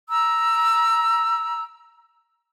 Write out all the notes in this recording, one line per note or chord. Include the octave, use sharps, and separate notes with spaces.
A#5 E6